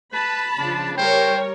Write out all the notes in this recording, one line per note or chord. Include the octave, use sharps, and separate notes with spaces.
B4 A5 B5
C#3 F3 D4
G3 A#4 C5 C#5 G5